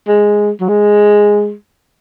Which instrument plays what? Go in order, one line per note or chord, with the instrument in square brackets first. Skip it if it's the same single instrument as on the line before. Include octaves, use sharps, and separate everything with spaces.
[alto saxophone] G#3
F#3
G#3